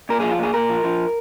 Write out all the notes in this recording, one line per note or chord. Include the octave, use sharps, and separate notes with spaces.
A#2 A#4
F3 G#4
F4
A#2 G#4
A#2 A#4
F3
F3